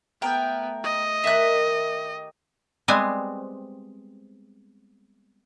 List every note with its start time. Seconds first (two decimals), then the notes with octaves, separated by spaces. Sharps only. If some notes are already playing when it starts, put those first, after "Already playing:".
0.22 A3 B3 A#4 G5
0.84 D#5
1.24 D#3 G4 A#4 E5 F#6
2.88 G3 G#3 B3 C4 C5 G#5